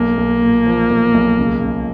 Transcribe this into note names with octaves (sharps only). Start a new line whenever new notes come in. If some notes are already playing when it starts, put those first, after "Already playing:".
Already playing: B1 A#3
B1
A#2
F3
B1
B1
C#2
C#2